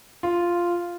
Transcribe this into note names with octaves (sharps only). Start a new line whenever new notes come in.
F4